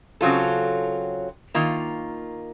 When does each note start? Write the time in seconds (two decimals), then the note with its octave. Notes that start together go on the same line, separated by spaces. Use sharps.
0.21 C#3 F#3 C4 F4 A4
1.54 D#3 A#3 F4